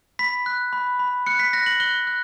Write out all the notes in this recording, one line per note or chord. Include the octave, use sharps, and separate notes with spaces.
B5 B6
F#6
B5
B5
F#6 C#7
B6
F#6 A#6
F#7
F#6 G7
F#6